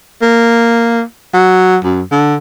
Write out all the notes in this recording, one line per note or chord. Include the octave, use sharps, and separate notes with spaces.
A#3
F#3
F#2
D3